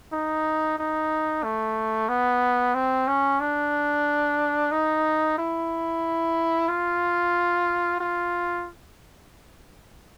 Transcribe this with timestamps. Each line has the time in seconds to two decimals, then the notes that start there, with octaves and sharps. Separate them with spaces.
0.12 D#4
0.79 D#4
1.44 A3
2.09 B3
2.74 C4
3.08 C#4
3.40 D4
4.71 D#4
5.38 E4
6.69 F4
8.00 F4